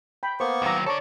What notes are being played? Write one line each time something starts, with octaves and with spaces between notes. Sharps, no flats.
G5 B5
A#3 B3 A#4 C5 C#6
D#2 F#3 A#5 D6
A4 C#5 D5 C#6